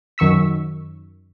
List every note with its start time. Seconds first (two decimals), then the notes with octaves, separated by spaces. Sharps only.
0.18 F#2 D#3 C#6 E6 B6